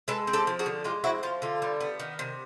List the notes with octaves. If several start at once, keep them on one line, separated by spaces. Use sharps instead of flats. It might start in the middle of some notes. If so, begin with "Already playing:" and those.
G#3 A4 B4
C4
G4 A4
F3
F#4 G#4
D3
G#3 F4 G4
C4 E4 F#4
F3 F4
D3 F4
G3
B3
D#3
C3